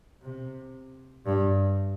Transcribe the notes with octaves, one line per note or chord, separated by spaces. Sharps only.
C3
G2